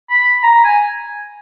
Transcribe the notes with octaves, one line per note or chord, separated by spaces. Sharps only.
B5
A#5
G#5